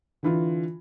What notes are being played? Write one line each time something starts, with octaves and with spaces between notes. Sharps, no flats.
D3 E3 F4